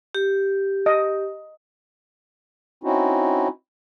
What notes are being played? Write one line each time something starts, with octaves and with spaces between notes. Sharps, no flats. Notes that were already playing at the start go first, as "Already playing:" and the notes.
G4
D#5
C4 C#4 D#4 E4 F#4